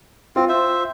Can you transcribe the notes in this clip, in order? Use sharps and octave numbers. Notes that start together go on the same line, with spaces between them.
C4 F4
C5 E5